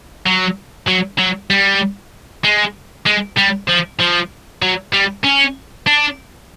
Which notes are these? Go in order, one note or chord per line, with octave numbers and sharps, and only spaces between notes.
F#3
F#3
F#3
G3
G#3
G#3
G3
F3
F3
F#3
G3
C#4
D4